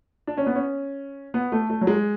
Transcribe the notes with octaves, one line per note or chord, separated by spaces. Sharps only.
D4
C#4
B3
C#4
B3
A3
A3
F#3
G#3